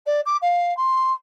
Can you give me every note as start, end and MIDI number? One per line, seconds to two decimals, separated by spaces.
0.06 0.20 74
0.26 0.37 86
0.42 0.76 77
0.77 1.12 84